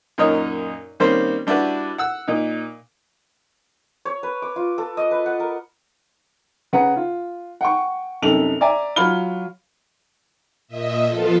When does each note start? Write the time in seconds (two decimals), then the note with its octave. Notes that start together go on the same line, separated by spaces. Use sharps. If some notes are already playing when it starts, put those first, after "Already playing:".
0.18 F#2 A#2 D#4 A#4 C#5 D#5
1.00 D#3 G3 A#3 C4 C#4 C5
1.47 G3 D4 E4 F#4 B4
1.98 F#5 E6
2.28 A#2 D#4
4.05 C#5
4.23 B4
4.42 D6
4.56 F4
4.78 A4
4.97 D#5
5.11 B4
5.26 F#5
5.40 A#4
6.73 C#3 B4 F#5 A#5
6.96 F4
7.61 F#5 G5 C#6
8.22 C2 F#2 D#4 A4 F7 F#7
8.61 D5 E5 G#5 A#5
8.96 F#3 F4 F#4 B5 F6 G7
10.67 A#2 D#5 E5
11.06 F3 B3 F4 A4